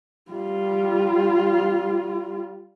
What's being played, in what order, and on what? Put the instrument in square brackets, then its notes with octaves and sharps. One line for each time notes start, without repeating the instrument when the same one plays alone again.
[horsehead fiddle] G3 F4